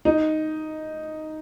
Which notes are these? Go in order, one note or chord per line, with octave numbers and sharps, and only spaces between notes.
D#4